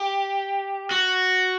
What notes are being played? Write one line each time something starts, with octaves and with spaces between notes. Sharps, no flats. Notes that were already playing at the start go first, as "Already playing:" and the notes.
Already playing: G4
F#4